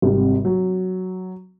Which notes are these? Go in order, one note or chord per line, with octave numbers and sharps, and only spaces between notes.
G#1 C3 G3
F#3